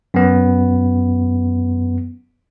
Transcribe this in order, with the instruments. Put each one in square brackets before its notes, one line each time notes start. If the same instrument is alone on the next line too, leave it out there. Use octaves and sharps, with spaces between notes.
[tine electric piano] F#2 B3